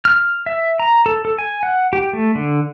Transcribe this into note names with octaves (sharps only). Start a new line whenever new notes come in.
F6
E5
A#5
A4
A4
G#5
F#5
G4
A3
D3